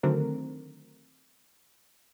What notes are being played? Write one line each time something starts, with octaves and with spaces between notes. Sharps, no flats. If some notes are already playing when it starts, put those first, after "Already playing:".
D3 D#3 F#3 A3 C4 A#4